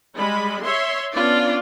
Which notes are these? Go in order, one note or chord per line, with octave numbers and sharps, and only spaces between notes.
G3 G#3 B5
C#5 E5 C6
B3 C#4 D4 F4 D5